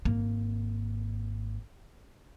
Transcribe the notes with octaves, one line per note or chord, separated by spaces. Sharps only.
G#1 A#3